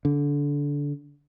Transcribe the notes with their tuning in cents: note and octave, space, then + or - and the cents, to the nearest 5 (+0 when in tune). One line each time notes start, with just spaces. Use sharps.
D3 -25